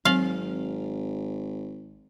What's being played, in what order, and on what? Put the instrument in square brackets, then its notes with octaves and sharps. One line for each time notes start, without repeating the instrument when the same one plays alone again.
[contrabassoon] G#1 [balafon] F#3 C4 [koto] F5